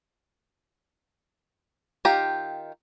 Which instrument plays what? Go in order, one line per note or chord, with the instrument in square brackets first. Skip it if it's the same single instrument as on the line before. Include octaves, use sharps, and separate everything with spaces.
[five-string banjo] D#3 F4 G4 A#5